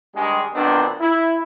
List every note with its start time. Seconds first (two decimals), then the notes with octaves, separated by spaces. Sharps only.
0.15 G2 D#3 G3 G#3
0.54 B1 A#2 D#3 B3 C4 D4
1.01 E4